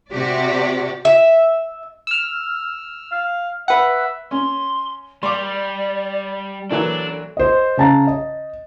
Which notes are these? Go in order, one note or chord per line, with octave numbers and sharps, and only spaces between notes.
C3 F#4 G4 D5
E5
E6 F6
F5
B4 E5 F#5
C#4 C6
G3 D5 C6 D6
A#2 E3 F#3 D4 A4
C5 D#5
C#3 C#4 A5 A#5 A6
D#5